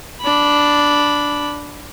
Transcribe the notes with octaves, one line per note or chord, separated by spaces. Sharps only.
D4 B5